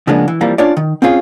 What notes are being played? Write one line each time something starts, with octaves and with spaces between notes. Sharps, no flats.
C#3 F3 G#3 A#3 B3 D4
E3
F2 E3 F3 G3 A#3
C#4 D4 F4 C#5 D5
D#3
C4 C#4 F4 G#4